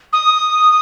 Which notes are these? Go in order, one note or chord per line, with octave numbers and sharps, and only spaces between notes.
D#6